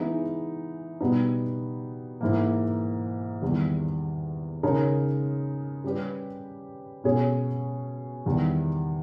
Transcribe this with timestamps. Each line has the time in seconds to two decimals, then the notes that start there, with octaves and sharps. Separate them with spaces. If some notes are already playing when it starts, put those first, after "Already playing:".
Already playing: E3 G#3 B3 D#4
1.01 B2 G3 B3 D#4
2.21 G#2 E3 A#3
3.42 E2 D#3 G3
4.63 C#3 G#3 D#4 A#4 C#5
5.84 G3 C#4 G4 B4
7.04 B2 G#3 C#4 G#4 C#5
8.26 E2 D#3 G3